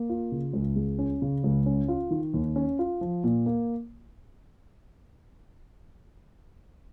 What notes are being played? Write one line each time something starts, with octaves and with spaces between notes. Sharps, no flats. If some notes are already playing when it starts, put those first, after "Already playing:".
Already playing: A#3
F4
C#3
C#2
G#3
C#4
C#3
C#2
C#4
F4
D#3
D#2
C#4
F4
F3
A#2
A#3